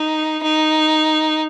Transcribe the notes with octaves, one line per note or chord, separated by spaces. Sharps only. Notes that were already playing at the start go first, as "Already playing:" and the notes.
Already playing: D#4
D#4